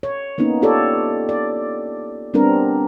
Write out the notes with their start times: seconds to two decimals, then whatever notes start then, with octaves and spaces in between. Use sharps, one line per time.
0.03 C#5
0.38 A#3 B3 C#4 D#4
0.62 F4 G4 A4 C#5 D5
1.29 D5
2.34 G3 B3 C4 D4 A#4